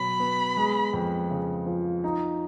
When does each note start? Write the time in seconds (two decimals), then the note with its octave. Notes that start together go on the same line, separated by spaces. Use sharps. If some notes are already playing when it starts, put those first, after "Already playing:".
Already playing: B2 F#3 B5
0.20 B3
0.57 G#3
0.93 F2
1.31 C#3
1.66 F3
2.04 D#4